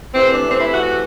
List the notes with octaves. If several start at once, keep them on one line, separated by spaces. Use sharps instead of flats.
C3 E3 A3 C4
D4
C4
E4
F#4
F#4